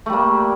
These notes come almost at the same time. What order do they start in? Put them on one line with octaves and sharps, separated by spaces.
A3 G3 A#3